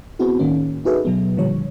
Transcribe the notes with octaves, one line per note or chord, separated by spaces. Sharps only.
B3 C4 E4 F#4 G#4
A2 D#3 A#3 C#4
D#4 F#4 G#4 A4 B4 E5
B2 F#3 B3
A#2 D3 F3 G3 C#5